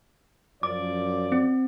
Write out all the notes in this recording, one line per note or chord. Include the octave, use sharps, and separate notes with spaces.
F#2 F3 D5 D6
C4